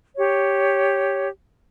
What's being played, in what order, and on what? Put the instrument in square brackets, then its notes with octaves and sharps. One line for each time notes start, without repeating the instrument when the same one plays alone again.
[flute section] G4 C#5